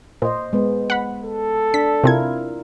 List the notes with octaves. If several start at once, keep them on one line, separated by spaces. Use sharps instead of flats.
A#2 C5 D#5
G#3 B3
F#5 B5
A4
D4 B6
C3 C4 E4 F4 A#4 G#6